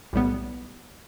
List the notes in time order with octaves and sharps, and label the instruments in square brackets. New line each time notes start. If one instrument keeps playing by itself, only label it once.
[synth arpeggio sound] B1 A2 G3 B3